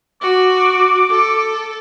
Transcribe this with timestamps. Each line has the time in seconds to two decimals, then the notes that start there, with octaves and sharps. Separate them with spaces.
0.22 F#4 D6
1.10 A4